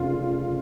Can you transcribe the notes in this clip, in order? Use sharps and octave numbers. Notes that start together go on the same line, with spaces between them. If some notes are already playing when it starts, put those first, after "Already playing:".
Already playing: F1 C#3 F4